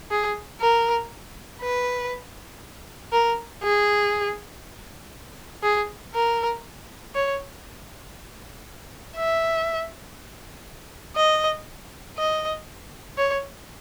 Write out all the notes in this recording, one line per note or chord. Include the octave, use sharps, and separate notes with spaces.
G#4
A#4
B4
A#4
G#4
G#4
A#4
C#5
E5
D#5
D#5
C#5